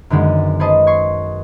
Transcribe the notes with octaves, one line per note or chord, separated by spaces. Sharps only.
F#2 D3 D#3 G#3 B3
G#4 A4 B4 C5 D#5 A5
C6 C#6 G#6